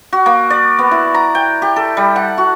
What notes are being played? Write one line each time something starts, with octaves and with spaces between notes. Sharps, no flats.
F#4
A#3
D5
B3
E4
A#5
G5
G4
A4
G3
F#5
F#4